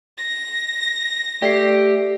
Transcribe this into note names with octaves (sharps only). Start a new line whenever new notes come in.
A#6
A3 G4 D5 C7